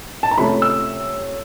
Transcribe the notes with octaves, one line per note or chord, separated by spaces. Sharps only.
A5
A#5
C3 F3 A3 C#4 B5
E6